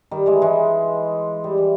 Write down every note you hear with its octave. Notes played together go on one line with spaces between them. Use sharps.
D#3 G3
E3 G#3
E3 G#3
G3
E3